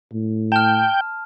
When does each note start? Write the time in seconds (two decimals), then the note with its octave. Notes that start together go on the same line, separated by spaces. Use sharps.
0.13 A2
0.52 G5 A5 F6